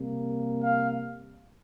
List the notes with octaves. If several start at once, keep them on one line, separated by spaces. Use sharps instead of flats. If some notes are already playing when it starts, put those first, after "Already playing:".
Already playing: C3 G3 A#3
F5